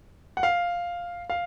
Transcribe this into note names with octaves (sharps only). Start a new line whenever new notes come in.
F#5
F5
F5